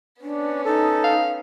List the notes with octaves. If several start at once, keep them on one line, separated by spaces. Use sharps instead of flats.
B3 C#4 D4
D#4 A4
F5